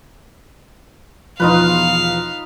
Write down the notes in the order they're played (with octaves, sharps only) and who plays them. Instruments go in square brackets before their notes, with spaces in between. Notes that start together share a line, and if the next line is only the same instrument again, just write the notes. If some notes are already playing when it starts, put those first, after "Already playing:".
[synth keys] E2 B2 F3 [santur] D#4 F4 B4 [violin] F5